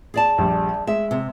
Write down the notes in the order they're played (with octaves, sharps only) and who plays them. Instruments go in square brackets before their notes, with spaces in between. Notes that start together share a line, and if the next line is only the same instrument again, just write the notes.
[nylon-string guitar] G#4 D5 A5
[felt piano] A#1 G3
[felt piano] G#3 [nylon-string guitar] E5
[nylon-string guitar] C3